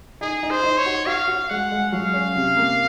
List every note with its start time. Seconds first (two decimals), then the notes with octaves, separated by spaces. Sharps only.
0.21 D#4 G#4
0.43 D#4
0.50 C5
0.63 D#4
0.78 C#5
0.86 F#4
1.06 F#4 F5
1.28 F#4
1.49 G#3 F#5
1.72 G#3
1.92 F#3 F5
2.13 C#4
2.36 C3
2.57 A#3